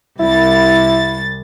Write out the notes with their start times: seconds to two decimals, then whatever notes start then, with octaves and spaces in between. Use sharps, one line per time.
0.20 C2 E4 A6